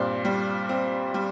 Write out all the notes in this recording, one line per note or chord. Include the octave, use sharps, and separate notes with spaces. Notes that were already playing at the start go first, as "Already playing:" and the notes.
Already playing: G2 A#2 C4
G3
C4
G3